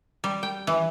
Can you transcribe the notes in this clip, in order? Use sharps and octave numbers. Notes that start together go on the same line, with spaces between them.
G3
G5
E3